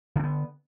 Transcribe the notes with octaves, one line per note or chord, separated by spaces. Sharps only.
D3 B3 C4